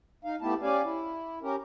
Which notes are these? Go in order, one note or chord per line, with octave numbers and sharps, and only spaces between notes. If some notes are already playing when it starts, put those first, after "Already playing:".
D#4 F5
A3 B3 E4 G4 A5
C#4 G4 D5 F5 G#5
E4
C#4 G4 A#4